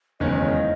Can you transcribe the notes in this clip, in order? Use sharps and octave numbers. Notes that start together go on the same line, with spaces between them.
F#1 E2 D#3 G#3 C#4 C#5 D#5
D#5